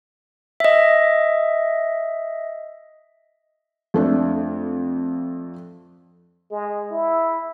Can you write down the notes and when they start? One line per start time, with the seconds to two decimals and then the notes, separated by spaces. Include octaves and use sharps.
0.60 D#5 E5
3.94 F2 A3 D4
6.51 G#3
6.91 E4